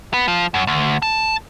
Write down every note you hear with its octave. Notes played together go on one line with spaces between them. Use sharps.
B3
F3
F#2
D2
A5